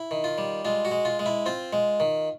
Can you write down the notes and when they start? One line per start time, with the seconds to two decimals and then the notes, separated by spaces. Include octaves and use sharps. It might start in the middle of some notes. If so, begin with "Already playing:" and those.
Already playing: E4
0.11 D#3
0.24 F4
0.38 G3
0.65 G#3 F4
0.85 F#4
0.91 G#3
1.05 F4
1.19 G#3
1.26 E4
1.46 C4 F4
1.73 G#3
2.00 D#3